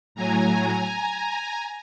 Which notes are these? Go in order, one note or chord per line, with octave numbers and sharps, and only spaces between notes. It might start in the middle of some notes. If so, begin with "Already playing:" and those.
A2 F#3 G#5 A#5